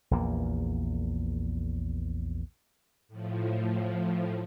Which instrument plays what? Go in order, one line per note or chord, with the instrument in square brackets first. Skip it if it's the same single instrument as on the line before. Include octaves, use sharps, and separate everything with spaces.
[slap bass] A#1 E2 A#3
[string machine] A2 F3